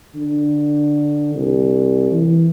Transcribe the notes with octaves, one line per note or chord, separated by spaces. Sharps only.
D3
C2
E3